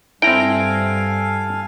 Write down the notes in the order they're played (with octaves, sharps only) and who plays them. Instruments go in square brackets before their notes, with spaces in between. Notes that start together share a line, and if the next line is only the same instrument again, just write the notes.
[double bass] G2 [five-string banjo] C4 E4 [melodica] A4 F5 G#5 [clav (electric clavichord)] G5 A#5